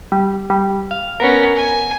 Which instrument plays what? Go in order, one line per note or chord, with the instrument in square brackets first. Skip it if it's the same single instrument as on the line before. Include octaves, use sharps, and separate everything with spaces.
[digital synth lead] G3
G3
F5
[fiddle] B3 C#4 [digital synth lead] A#4
[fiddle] G#5